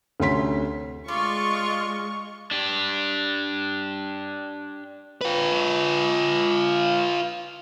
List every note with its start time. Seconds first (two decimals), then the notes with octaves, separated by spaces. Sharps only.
0.20 D2 C3 C#4 C6 B6
1.08 G#3 F4 D5 C#6
2.51 D4 G4
5.21 F4 B4